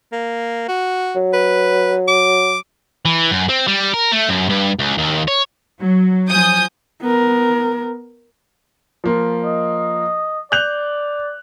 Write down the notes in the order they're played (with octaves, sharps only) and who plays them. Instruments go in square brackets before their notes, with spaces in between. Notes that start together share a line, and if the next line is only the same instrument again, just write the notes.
[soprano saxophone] A#3
F#4
[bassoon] F#3
[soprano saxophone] B4
D6
[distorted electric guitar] E3
F#2
C4
G3
A#4
A3
F#2
G2
C#2
D#2
C#5
[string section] F#3
F3 G#5 D#6 G6
[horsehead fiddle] B3 A#4
[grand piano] F3 A#3 F4
[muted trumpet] D#5
[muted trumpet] D5 [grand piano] F#6 G6 F7